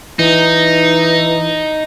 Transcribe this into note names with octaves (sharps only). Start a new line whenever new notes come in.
E3 D#4